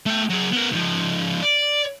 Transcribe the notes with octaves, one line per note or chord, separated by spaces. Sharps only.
A3 G5
F#3 G#4
B3 A#4
G#2 F3
D5